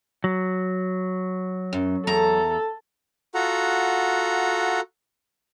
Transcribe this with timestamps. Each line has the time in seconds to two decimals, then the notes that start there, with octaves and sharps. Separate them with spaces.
0.24 F#3
1.73 F#2
2.07 E2 A4 A#5
3.34 F4 F#4 A4 F#5 A#5